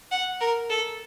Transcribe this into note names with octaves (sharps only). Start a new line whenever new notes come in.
F#5
A#4
A4